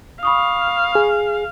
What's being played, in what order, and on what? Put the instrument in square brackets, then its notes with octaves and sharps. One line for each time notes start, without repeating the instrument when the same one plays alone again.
[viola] F5 [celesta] B5 C#6 D#6
[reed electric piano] G#4